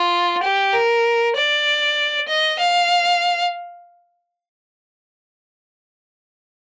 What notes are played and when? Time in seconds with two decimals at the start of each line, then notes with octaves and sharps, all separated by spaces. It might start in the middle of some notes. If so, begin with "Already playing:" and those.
Already playing: F4
0.42 G4
0.73 A#4
1.35 D5
2.28 D#5
2.59 F5